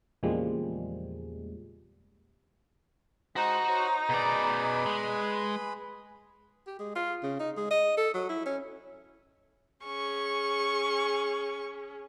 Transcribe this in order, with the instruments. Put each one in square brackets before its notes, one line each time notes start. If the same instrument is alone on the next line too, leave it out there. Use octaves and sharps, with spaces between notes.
[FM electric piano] E2 A#2 C#3 F3 G3 G#3
[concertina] G#3 C5 D#6 [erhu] D#4 [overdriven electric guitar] F#4
[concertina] C5 C#5
[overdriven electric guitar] B2 D5 [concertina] G#4 B4 B5
[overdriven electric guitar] G#3
[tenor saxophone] G4
G#3
F4
C#3
D#4
G#3
D#5
A4
F#3
E4
C#4
[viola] C#4 G#4 [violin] C#6